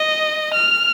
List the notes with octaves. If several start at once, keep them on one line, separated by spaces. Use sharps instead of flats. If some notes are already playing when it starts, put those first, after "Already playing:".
Already playing: D#5
F6